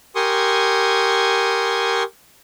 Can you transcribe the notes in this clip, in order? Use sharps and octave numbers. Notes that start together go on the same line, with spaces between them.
G4 A#4 G#5 C6 C#6 D#6